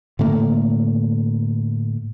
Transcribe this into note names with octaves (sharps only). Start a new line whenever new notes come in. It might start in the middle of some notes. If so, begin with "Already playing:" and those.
A2 D3 A3 A#3